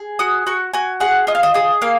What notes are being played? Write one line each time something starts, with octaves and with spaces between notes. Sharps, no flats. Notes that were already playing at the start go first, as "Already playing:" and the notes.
Already playing: G#4
F#4 D#6
F#4 C#6
F#4 G#5
G#4 F#5
F4 D#5
F5
D#5
G#4 D#5
A#3 F5